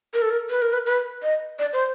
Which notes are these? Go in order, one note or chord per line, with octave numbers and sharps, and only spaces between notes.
A#4
A4
A#4
B4
A#4
B4
B4
D#5
D5
C5